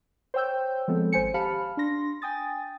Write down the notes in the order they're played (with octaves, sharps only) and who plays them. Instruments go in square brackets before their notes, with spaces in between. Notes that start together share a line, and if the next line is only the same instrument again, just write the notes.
[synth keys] C5 C#5 G5 E6 G6
F3 G#3 B3 C4 A4
G#1 C5 G#5 C#7
G4 F5 A5 B5 F6
D4 C6 A#6
G5 G#5 D#6 A6